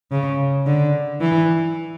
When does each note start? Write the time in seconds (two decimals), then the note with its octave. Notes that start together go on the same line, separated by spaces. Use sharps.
0.11 C#3
0.66 D3
1.21 E3